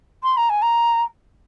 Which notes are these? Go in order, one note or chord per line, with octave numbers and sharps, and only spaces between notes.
C6
A#5
G#5
A#5